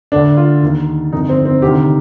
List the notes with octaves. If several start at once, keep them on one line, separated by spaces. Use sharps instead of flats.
D2 D3 D4
F4
D#2 D#3
G1 F2 D#3 D#4
C4
C4
D2 C3 D#3 G4